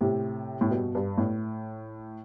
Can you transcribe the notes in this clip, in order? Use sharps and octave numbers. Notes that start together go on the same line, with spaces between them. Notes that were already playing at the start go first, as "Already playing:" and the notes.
A2 C3
A2
G2 B2
G2
A2